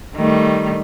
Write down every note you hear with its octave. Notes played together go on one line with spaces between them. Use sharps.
D#3 G3 A3